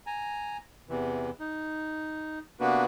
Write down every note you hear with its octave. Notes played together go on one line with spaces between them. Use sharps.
G#5 A#5
E2 C3 E3
D#4
C3 A#3 B3 D4 F#4 B4